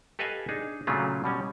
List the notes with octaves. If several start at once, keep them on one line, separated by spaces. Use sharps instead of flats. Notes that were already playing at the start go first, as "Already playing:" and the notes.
G4 A4 B4 D#5 F5 G#5
D4 D#4 G#4
A#2 C#3 F#3 A3 C#4 F4
B2 G3 C#4